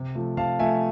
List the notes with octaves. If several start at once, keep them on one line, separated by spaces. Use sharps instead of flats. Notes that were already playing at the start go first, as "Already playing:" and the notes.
Already playing: C3
F3 A3
C3 F5 A5
F3 A3 E5 G#5